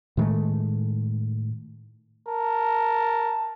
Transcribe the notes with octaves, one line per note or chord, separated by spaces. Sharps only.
A2 D#3 G#3 A3
A#4 A5